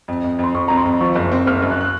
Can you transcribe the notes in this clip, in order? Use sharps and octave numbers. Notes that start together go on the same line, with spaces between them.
F2
F2
F2 C6
F2 C#6
F2 A#5
C6
F2
F3 C#6
F#1
C4
F#1 F6
F#2
F#6
F#6